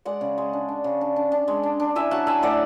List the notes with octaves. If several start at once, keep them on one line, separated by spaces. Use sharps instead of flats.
G#3 D5 F#5
C#3
G#3
D4
D4
C#3
D4
D4
D4
G#3
D4
D4
E4 E5 G#5
F#3 F#5 A5
E4 E5 G#5
A2 D5 F#5